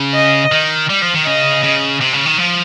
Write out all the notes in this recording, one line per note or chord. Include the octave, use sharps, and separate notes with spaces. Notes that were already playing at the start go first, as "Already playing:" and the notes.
Already playing: C#3
D#5
D#3
G3
F3
D#3
C#3 D#5
C#3
C3
C#3
D#3
F3